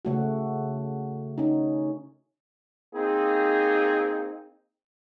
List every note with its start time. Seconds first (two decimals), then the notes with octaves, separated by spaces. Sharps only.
0.05 C#3 A3 F#4
1.38 C#4 D#4
2.94 A#3 C4 D#4 G#4